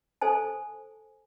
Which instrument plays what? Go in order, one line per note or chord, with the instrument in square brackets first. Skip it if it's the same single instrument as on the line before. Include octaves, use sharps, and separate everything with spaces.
[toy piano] A4 C5 G#5 A5